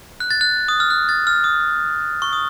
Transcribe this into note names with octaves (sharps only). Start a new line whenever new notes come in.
F#6
A6
F#6
D#6
F6
F#6
A6
F6
D#6
C#6
D#6